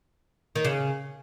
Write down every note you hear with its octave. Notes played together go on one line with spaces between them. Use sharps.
D#3
C#3